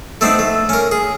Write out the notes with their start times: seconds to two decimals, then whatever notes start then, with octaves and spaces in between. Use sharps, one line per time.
0.21 A3 B3 C4 D4 D#4
0.39 A3
0.69 C#4 A#4
0.92 G#4